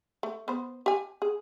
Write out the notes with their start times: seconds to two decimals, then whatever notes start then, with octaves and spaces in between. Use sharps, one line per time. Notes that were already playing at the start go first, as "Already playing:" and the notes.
0.23 A3
0.48 B3 C5
0.86 G4 G#5
1.22 G#4